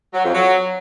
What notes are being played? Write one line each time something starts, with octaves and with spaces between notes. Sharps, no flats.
F#3
F2
F#3